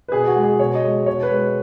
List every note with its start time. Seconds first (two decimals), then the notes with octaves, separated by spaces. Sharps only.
0.08 B4
0.12 B2 G#4
0.27 F#4
0.36 G#3
0.43 G#4
0.59 B2 C#5
0.75 D#5
0.84 G#3
1.06 B2 C#5
1.23 B4
1.31 G#3